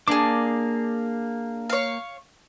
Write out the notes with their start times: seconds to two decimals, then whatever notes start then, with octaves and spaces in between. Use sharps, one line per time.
0.08 A#3 D4 G#4 D6
1.70 C#5 F5